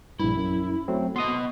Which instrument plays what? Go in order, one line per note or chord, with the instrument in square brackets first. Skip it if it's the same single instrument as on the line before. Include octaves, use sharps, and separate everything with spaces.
[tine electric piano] A#1 G2 [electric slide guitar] E4
[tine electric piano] F#2
F#3 A3 C4
[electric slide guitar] B3 D#5 [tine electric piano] C6 D#6